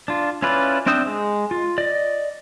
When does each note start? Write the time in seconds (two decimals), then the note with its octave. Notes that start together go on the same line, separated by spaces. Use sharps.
0.08 D4 F4
0.42 C#4 E4 F4 B4 D5
0.86 C4 D4 E5 G5 D#6
1.06 G#3
1.51 F4
1.78 D5 D#5